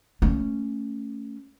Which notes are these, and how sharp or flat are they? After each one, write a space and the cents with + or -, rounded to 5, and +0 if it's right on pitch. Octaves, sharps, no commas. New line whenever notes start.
A3 +15 C#4 +0